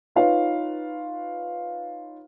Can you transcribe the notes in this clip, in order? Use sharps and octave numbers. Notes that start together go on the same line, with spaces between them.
D#4 F4 B4 C#5 F5